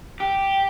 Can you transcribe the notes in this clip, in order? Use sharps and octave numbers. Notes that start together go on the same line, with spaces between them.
G4